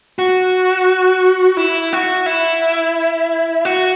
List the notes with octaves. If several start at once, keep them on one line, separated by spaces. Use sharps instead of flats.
F#4
E4
F#4
E4
F#4